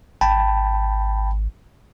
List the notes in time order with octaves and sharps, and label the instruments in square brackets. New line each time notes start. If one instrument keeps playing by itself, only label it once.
[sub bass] G#1 [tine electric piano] G5 A5 B5